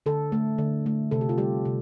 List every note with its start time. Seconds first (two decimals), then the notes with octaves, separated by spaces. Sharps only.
0.06 D3 A4
0.32 A3
0.58 D3
0.86 A3
1.11 C3 A4
1.21 G4
1.29 F4
1.38 G3 G4
1.65 C3